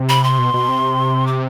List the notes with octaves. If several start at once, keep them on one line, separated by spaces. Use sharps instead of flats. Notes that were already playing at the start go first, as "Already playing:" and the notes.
Already playing: C3
B5
C6
B2
B2
C3
D6